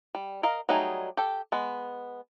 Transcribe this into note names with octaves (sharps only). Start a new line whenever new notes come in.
G3
A#4 D#5 F5
F#3 G3 A3 D#4 G#4
G4 A4 G5
G#3 B3